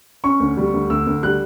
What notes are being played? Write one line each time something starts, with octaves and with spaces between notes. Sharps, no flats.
C#4 C#6
D2
G3
D2
D2 E6
D2
G3 F#6